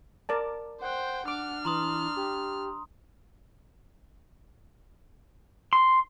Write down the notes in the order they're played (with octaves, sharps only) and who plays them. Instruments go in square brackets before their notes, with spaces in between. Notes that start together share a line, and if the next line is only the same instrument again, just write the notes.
[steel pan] A#4 D5 A5
[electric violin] C5 G5 [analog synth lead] F#5
[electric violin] D4 F6 [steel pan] D6
[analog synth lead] E3 [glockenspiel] A#5 C6 D#6
[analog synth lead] G4
[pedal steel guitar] C6